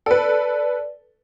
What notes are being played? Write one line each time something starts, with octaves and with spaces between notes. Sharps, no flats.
A4 B4 D5